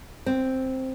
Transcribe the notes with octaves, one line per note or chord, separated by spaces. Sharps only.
C4